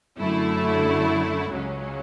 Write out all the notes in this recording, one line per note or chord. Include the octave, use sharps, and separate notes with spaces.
F#2 D3 A3 E4
C#2 C#3 F#3 C#4